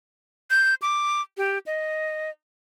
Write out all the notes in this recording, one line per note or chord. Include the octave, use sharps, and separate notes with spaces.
G6
D6
G4
D#5